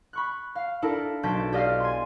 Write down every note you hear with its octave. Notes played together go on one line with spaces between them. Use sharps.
B5 C#6 F#6
F5
D4 E4 A4 A#4
B1 A5 G6 B6 D7 E7
G4 D5 D#5 F5 F6
G#5 C6